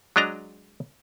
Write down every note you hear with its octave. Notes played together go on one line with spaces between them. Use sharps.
F#3 G#3 D4 D#5 A#5